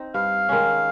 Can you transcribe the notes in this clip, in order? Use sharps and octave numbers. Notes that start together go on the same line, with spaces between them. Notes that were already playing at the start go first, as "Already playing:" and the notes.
Already playing: C4 D#4
G2 F5
D#3 G#3 C#4